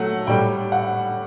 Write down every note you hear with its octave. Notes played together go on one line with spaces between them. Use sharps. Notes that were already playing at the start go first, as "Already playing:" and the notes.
Already playing: F#3 A3 F#5
A2 G3 G5
F#5